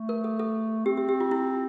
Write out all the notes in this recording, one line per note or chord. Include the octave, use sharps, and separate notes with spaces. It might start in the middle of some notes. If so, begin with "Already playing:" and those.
Already playing: A3
A#4
A4
A4
C4 G4
G4
G4
F4
E4